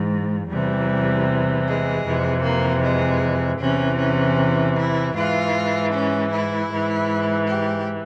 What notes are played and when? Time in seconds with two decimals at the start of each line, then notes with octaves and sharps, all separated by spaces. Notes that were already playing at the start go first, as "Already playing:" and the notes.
Already playing: G#2 E3
0.48 E2 C3 E3 G3
1.66 G#3
2.05 F2 C3 E3
2.43 A#3
2.82 G#3
3.59 E2 C3 E3 C#4
3.99 C#4
4.77 E4
5.14 G#2 E3 F4
5.92 C#4
6.32 E4
6.70 G#2 E3
7.48 G4